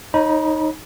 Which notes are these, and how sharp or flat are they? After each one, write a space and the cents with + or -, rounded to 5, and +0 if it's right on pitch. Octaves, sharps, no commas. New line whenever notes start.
D#4 +0 C#5 -30 B5 -30